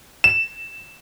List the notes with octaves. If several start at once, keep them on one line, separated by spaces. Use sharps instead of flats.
E7